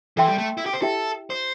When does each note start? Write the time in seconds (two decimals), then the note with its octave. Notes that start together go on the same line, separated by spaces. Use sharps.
0.17 E3 A4 E5 G5 C6
0.28 G3
0.38 A3
0.57 E4
0.66 G4
0.73 C5
0.82 E4 G4 A4 E5 G5
1.30 C5